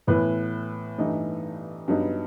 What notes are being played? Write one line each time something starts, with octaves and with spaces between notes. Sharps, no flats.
A2 E3 B3 E4 B4
G2 E3 A3 D#4
G2 F#3 B3 D#4